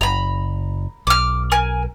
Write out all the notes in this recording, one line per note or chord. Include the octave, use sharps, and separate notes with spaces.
F#1 A#5 B5
B1 D6 F6
A#4 G#5